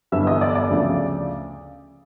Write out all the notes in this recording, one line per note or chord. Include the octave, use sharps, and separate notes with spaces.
G1 G2 E3 E5 E6
D#5 D#6
D5 D6
D5 D6
D2 C#3 F3